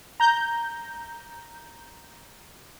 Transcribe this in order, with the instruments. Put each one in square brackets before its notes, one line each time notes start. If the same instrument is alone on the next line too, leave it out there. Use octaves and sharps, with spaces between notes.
[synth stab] A#5 G6